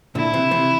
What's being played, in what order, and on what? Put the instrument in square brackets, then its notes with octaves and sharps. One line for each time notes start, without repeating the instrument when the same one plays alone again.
[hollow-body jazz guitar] A#2 D3 [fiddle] E4
[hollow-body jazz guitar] C3 E3
C3 E3